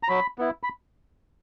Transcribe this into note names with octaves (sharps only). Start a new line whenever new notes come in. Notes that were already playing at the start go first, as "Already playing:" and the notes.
A#5
F#3 B5
B3 E4
B5